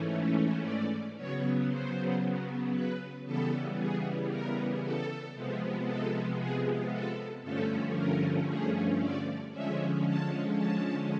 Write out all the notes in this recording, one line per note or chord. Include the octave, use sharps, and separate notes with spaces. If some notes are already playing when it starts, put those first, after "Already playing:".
Already playing: G#2 E3 A3 C#4
D5
C#3 F#3 B3 C#5
C5
B4
C#3 E3 G3 B3 A4
G#4
A#4
A4
C3 F3 G#3 B3
A4
G#4
A4
G2 D3 F3 A3 C#4 A4
A#4
G#4
D5
D3 F3 G#3 C#4 E5
A5
A5